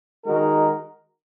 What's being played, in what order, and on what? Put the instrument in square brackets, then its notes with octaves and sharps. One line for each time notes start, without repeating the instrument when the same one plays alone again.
[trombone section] D#3 G#3 D#4 F#4 A#4